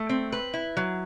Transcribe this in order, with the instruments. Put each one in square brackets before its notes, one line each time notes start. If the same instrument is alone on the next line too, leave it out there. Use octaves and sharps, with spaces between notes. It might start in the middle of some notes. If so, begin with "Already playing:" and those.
Already playing: [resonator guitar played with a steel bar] A3
C4
B4
E4
F#3